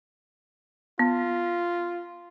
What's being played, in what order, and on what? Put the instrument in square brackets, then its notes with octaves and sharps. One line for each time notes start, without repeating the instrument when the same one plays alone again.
[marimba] B3 [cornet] F4